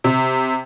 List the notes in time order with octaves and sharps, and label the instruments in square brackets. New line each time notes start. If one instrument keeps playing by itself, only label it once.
[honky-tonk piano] C3